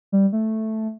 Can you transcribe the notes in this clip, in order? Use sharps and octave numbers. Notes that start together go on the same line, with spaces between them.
G3
A3